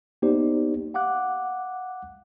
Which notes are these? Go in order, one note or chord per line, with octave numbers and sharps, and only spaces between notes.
A#3 B3 D#4 G4 C5 D5
F5 F#5 D6 F#6